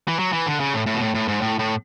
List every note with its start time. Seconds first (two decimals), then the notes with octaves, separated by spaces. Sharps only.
0.08 E3
0.19 F#3
0.33 E3
0.46 D3
0.60 C#3
0.73 A2
0.86 A2
0.95 B2
1.01 A2
1.15 A2
1.28 G#2
1.41 A2
1.59 A2